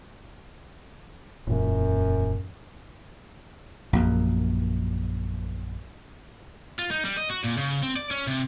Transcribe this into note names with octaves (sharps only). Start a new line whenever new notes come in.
E1 F#2 A#2 E3
A#1 F#2
F4
D#4
G3
D#5
F#4
A#2
C#3
C4
D5
C#4
C3